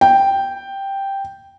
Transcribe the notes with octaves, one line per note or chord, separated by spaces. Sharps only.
G5